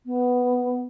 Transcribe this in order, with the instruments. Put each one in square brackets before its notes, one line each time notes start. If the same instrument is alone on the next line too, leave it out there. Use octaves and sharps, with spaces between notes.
[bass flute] B3